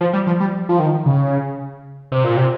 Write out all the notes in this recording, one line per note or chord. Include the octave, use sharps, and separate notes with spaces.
F3
G3
F3
G3
F3
D#3
C#3
C3
A#2
C3